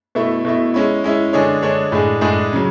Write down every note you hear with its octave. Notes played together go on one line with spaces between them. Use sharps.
B2 A3 E4
B2 A3 E4
G#3 C#4 E4
G#3 C#4 E4
D3 G#3 D4 G#4 C#5
D3 G#3 D4 G#4 C#5
A2 G#3 D4 G#4
A2 G#3 D4 G#4
C#3 F#3